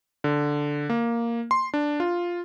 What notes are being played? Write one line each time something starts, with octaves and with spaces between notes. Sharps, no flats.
D3
A#3
C6
D4
F4